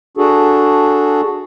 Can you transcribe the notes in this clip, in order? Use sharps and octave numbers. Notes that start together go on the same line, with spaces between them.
D4 F#4 G#4 A4